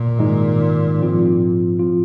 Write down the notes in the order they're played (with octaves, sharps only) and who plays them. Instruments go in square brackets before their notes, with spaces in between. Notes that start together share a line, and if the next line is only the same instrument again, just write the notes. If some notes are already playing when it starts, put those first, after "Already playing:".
Already playing: [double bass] A#2
[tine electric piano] G#2 D#3 G#3 D#4
G#2 F3 C4 F4
F3 C4 F4